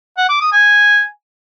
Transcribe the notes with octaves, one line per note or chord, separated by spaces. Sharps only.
F#5
D6
D#6
G#5